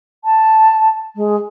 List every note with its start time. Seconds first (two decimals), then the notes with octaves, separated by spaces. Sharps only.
0.24 A5
1.16 G#3